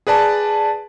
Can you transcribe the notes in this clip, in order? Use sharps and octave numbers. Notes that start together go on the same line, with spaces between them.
G#4 B4 D5 A5